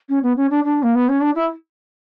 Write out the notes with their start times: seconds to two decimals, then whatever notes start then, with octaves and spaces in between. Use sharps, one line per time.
0.09 C#4
0.23 B3
0.36 C#4
0.50 D4
0.64 D4
0.83 A#3
0.95 B3
1.08 C#4
1.20 D4
1.35 E4